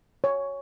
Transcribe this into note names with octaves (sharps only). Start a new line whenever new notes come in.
C#5